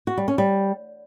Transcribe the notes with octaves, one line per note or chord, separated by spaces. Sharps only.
F#4
G3
C#4
G3